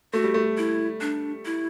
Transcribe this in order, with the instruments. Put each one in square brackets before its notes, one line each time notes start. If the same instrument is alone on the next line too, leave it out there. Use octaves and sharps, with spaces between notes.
[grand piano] A3 [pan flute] F#4
[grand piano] G3
A3
[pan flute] E4
D4
E4